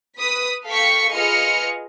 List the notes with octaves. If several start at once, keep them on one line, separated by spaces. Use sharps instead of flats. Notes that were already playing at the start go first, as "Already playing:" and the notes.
B4 D#6 B6
A4 F5 G5 C#6 B6 C#7
F4 G#4 B4 D#5 F6 C#7